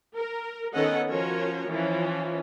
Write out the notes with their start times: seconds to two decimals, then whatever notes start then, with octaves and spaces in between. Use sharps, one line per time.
0.15 A#4
0.73 D#3 B3 C#4 A4 D#5 F#5
1.09 F3 C#4 F#4 A#4 C#5
1.69 E3 F3 C#4